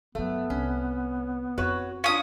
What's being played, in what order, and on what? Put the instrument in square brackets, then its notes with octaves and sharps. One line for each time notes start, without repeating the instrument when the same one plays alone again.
[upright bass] G2 F#3 [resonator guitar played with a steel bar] A3 [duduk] B3
[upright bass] C2 [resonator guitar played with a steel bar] C#4
[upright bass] F2 E4 [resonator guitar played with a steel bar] F#4 B4 C#5
[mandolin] C#4 D#6 [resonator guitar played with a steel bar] D4 F5 [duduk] F4